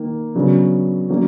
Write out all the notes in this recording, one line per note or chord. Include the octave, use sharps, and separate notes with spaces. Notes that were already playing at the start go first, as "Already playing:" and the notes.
Already playing: D#3 A#3
C#3 F#3 B3 D4
D3 F#3 A#3 C#4